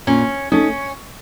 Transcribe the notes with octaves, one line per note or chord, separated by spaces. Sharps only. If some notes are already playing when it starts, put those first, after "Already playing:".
A#2 C#4
A3 C#4 D#4